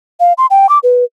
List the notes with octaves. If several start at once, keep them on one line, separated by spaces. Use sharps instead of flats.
F5
C6
G5
D6
B4